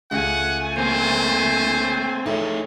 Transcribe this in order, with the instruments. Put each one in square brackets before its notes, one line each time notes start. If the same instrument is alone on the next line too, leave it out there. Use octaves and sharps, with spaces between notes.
[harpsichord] C#2 [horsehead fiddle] A3 G#5 [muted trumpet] F#5
[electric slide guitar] A#3 C4 [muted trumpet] C5
[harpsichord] A2 [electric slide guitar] D#4 G#4 C#5